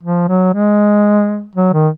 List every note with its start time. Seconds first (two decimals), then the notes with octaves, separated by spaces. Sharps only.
0.03 F3
0.28 F#3
0.54 G#3
1.56 F#3
1.74 D#3